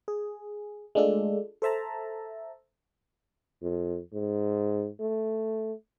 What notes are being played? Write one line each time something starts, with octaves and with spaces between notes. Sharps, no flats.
G#4
G#3 A3 D4 F4 A4
A4 C5 E5 A5 A#5
F2
G#2
A3